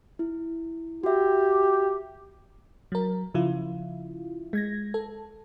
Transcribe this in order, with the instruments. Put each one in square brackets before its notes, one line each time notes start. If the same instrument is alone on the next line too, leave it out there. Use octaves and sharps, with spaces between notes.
[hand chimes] E4
[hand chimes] F#4 E5 [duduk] G4
[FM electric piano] F#3 A#4
C#3 F3 E4 F4
G#3 G#6 A#6
A4